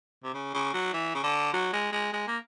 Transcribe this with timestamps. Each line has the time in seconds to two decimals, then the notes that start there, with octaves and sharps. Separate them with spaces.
0.24 C3
0.34 C#3
0.54 C#3
0.74 F#3
0.93 E3
1.14 C#3
1.23 D3
1.53 F#3
1.73 G#3
1.92 G#3
2.13 G#3
2.27 A#3